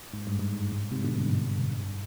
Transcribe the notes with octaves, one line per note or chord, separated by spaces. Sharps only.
G#2
G2
G#2
G#2
G#2
G#2 C3
B2 D3
G2 B2
G#2
G2
G#2
G2